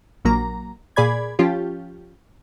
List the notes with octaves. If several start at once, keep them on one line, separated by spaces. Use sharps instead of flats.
A#1 F#3 A#3 A#5
A#2 G#4 D5 B5 G#6
F3 C#4 F4 G4